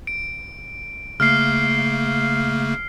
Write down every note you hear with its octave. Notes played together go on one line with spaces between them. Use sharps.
D7
C#3 A3 A#3 F6 C7